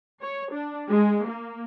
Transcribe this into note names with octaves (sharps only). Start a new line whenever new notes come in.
C#5
D4
G#3
A#3